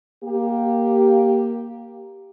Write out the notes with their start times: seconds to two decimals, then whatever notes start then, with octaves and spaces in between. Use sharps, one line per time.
0.24 A#3 G4